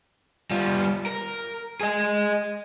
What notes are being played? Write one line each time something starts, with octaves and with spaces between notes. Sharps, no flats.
G3 F4
A#4
G#4 D#5